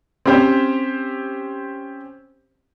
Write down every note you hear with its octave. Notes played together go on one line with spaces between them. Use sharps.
C4 C#4 G4 C5